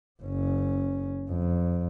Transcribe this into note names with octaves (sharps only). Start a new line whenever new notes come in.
F#1 C#4
F2